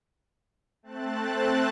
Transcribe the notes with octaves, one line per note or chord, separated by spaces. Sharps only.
A3 C4 A5 F#6 A6